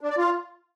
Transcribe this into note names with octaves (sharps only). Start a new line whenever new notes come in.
D4
D5
F4